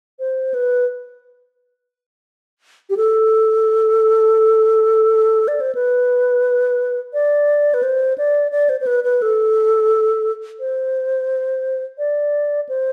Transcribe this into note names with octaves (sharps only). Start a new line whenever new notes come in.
C5
B4
G4
A4
D5
C5
B4
D5
B4
C5
D5
D5
C5
C5
B4
B4
A4
C5
D5
C5